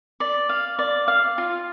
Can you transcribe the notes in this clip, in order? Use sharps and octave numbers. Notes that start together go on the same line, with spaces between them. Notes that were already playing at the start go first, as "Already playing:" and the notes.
D5
F5
D5
F5
F4